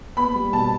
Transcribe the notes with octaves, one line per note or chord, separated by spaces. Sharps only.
B3 B5
G3
B2 A5